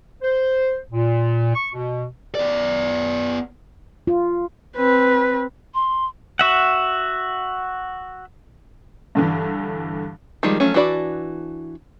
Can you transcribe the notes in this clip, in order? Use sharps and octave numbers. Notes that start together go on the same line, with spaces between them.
C5
A#2
C#6
B2
B3 D5
F4
C4 B4
C6
F#4 E5 F#5
G2 D3 E3
D#3 F3 G3 G#3
F3 F#3 A3 C#4
E3 D4 F#4 D5 B5